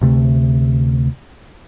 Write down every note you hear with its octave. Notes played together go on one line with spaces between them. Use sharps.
D2 C3 A3